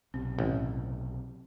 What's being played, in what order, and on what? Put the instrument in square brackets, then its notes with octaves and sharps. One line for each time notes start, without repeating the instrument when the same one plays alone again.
[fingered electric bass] B1 C3 [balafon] C4
[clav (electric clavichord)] A1